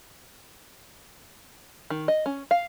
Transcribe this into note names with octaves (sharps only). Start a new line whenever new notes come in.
D#3
D#5
C#4
F5